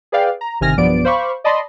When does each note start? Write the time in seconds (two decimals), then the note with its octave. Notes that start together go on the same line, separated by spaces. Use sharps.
0.12 G#4 B4 D5 F5 G5
0.41 A#5
0.61 G1 C3 D#3 G#5 F6 A#6
0.77 B1 G2 F3 B3 D5 D7
1.05 C5 F5 B5 C#6 D6
1.44 D5 D#5 A5 B5 C6